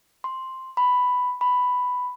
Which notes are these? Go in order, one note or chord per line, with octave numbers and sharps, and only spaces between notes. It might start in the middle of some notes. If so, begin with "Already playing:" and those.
C6
B5
B5